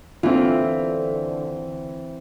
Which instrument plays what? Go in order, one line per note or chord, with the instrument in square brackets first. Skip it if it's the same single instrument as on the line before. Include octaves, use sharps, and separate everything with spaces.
[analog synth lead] D3 [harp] E3 C4 [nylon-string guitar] F4